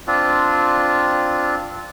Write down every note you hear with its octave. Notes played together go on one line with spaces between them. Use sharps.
C4 D4 F4